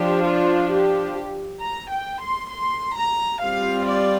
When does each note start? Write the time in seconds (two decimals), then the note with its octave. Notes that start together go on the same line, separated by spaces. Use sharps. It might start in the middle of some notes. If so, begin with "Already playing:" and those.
Already playing: F3 D4 G4
0.24 F4
0.70 G4
1.61 A#5
1.91 G5
2.22 C6
2.51 C6
2.97 A#5
3.42 G3 C4 F4 F5
3.87 D5